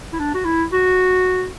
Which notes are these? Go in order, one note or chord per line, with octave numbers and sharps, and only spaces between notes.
E4
D4
F#4
E4
F#4